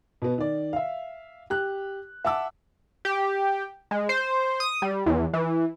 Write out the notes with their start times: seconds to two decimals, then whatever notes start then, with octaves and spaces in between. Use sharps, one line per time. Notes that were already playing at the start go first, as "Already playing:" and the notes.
0.22 B2 B3
0.38 D#3 D5
0.73 E5 F5
1.50 G4 F#6
2.25 E5 F#5 A5 D6 E6
3.05 G4
3.91 G#3
4.09 C5
4.60 D#6
4.82 G3
5.06 E2
5.33 E3